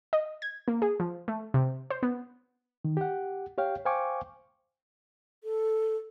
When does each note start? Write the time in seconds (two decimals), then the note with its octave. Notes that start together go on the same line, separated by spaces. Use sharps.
0.13 D#5
0.42 G#6
0.68 A#3
0.82 G#4
1.00 F3
1.28 A3
1.54 C3
1.90 C5
2.03 B3
2.85 D#3
2.97 G4 F#5
3.58 G4 C#5 F5 G5
3.85 C5 F5 G5 G#5 C#6 D6
5.44 A4